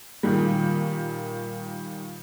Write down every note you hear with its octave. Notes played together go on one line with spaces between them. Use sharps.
A#2 D#3 G3